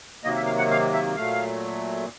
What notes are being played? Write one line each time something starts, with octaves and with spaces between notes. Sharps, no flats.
C3 D#3 F#3 A#3 D#5
E5
F5
F#5
F5
E5
A#2 F#3 A3 F5